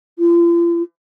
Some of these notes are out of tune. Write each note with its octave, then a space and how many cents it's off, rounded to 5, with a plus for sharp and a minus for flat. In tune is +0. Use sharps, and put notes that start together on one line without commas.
F4 -40